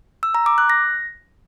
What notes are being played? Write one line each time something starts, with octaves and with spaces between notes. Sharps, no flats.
E6
A#5
D6
F#6
A#6